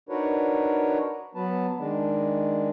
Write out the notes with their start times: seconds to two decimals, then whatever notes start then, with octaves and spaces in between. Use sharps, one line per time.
0.09 D4 D#4 F#4 A#4 B4 C#5
1.35 F#3 B3 B4 A5
1.79 D#3 G#3 D4